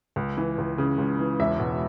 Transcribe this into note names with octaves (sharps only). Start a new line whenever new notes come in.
C#2
E3
C#2
C#3
C#2
E3
E1 E5
B2